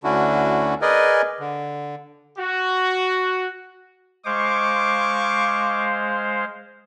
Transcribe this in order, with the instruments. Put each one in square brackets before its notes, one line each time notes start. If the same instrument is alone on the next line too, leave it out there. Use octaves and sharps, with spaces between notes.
[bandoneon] D2 D3 C#4 D4 E4 F#4
G#4 A#4 B4 D5 D#5 G#5
D3
[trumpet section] F#4
[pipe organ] G#3 C5 F5 [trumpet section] C#6 D6